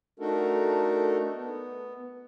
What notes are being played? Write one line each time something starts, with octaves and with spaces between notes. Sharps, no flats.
A3 D4 D#4 F#4 A4 A#4
B3